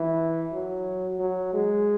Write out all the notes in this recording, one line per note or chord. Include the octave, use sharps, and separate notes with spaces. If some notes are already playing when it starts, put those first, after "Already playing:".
Already playing: E3
F#3
F#3
G#3